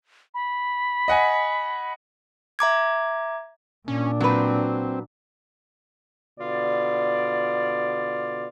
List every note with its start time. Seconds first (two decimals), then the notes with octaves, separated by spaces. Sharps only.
0.34 B5
1.08 D#5 F#5 G#5
2.59 E5 A#5 D6 G#6
3.88 A#2 C#4 D4
4.20 F#3 C4 B4
6.40 B2 D3 F4 D5